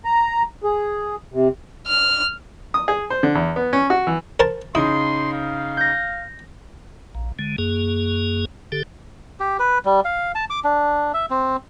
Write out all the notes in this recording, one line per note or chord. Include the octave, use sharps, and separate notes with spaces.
A#5
G#4
C3
F6
D#6
G#4
C5
D3
E2
B3
C#4
F#4
E3
A#4 C5 A5
C#3 D#4 E4 C6 D#6
F5
G6 A#6
A#1
D3 G#3
F#2 A#3 G#4
D3 G4 A4
G4
B4
G3
F5
A5
D6
D4
E5
C4